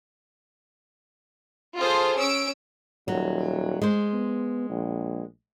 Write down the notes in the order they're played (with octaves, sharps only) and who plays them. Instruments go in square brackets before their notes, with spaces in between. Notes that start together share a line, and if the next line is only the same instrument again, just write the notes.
[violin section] F4 G#4 A4 C5
C#4 E6 D7
[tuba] D#1 [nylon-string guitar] F#3
[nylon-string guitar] G#3 C5
[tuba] B3
A#1